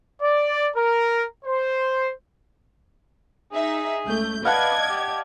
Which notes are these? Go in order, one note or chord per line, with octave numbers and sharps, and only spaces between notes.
D5
A#4
C5
D#4 G#4 E5
C#2 A3 G6
B4 D5 D#5 F5 F#5 A5 G#6
G4